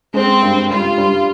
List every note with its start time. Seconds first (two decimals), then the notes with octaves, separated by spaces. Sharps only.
0.14 G#3 C4
0.42 G2
0.70 G3 F4
0.98 G3